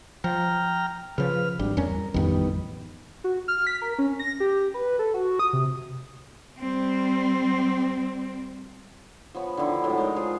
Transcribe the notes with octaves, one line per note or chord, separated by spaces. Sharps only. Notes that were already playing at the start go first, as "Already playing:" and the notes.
F3 G5 A#5 F6
C#3 F3 B4 F6
G#1 G3 D4
E2 G3 C#4 A#4
A1 F2 D#3 G3 B3
F#4
F6
B6
A#4
C#4
A#6
G4
B4
A4
F#4
D#6
C3
G3 C4
F3 B3 C#5
D3 D#3 F3 E4
A2 F#3 G#3
G#3 D#4 A#4
F3 F4 G#4